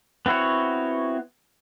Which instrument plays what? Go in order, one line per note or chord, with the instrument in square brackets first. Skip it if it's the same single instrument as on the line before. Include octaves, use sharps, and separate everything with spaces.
[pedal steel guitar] B3 C4 E4 F#4 C#5